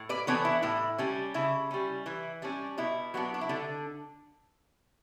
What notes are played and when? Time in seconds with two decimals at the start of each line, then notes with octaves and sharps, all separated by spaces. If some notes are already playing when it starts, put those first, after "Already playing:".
Already playing: A2
0.09 B4 D5
0.27 E3 B3 D4 A4 C#5
0.45 E4
0.62 A2 E4
0.98 G3 C#4 D4
1.34 C#3 E4
1.71 G3 C#4
2.06 E3 E4
2.42 G3 C#4 D4
2.78 B2 E4
3.14 F#3 B3 D4
3.34 D4
3.41 E4
3.49 D3 D4